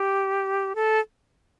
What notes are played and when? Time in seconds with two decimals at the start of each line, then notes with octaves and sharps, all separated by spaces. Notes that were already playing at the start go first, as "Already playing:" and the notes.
Already playing: G4
0.75 A4